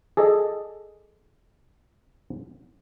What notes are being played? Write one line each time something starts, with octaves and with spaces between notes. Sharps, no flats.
G#4 A4 D5 D#5